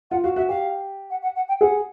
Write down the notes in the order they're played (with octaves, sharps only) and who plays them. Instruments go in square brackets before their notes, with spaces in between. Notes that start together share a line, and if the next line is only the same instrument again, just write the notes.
[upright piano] F4 [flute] F#5
[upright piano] F#4 [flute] F5
[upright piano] F#4 [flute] E5
[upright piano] G4 [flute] F5
[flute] F#5
F#5
F#5
G5
[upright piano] G#4 [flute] F#5